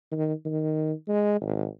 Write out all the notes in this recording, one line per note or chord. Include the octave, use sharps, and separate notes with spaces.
D#3
D#3
G#3
G#1